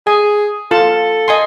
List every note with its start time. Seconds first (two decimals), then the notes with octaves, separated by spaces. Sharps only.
0.07 G#4 G#5
0.71 F4 A4 A5
1.28 D#5 G#5 C6